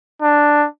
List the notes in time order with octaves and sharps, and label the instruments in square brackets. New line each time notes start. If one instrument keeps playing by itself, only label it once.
[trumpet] D4